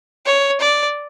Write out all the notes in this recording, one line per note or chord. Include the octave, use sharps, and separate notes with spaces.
C#5
D5